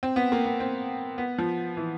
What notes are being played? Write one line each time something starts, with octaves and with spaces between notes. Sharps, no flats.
C4
B3
A#3
B3
C4
B3
F3
E3